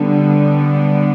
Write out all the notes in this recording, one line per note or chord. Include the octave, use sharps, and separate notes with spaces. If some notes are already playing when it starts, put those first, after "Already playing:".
Already playing: D3 G3 B3